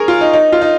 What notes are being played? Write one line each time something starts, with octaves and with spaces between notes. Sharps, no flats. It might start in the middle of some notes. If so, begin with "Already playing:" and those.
Already playing: G#4 A#4 C#5
F4
D#4
D#4
F4
D#4